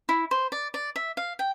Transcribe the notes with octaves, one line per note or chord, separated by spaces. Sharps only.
E4
C5
D5
D5
E5
F5
G5